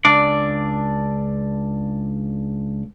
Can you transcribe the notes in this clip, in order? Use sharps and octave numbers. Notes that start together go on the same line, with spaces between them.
C#2 D4 D5